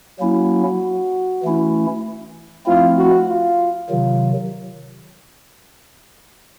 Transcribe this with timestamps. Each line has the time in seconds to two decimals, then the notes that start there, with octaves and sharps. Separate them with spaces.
0.20 F#3 A#3 C#4 E4 F#4
1.43 E3 A3 C#4 E4
2.66 F3 A3 C4 E4 F4
2.98 F#4
3.28 F4
3.90 C3 D#3 F#3 F4